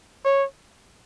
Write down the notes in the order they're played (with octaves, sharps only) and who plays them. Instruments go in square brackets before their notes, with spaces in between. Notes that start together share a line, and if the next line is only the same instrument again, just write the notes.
[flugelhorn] C#5